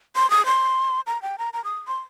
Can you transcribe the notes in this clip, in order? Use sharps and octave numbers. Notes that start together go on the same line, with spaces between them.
C6
D#6
C6
A#5
G5
A#5
A#5
D#6
C6